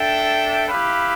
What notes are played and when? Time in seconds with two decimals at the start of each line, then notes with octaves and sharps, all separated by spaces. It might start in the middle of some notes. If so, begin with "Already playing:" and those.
Already playing: D4 A4 E5 G5
0.67 E4 G4 B4 F5